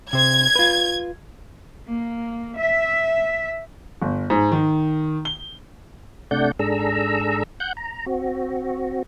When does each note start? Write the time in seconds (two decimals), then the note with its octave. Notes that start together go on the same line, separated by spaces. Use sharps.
0.13 C3 C5 G#6
0.56 F4 B4
1.89 A#3
2.58 E5
4.02 G1
4.30 G#2
4.52 D#3
5.25 G7
6.31 C3 A3 D4 D5 F#5 G6
6.59 G#2 D4 G#4 A4 A#5 E6
7.60 F#5 F#6 G6
7.77 A#5
8.06 C4 F#4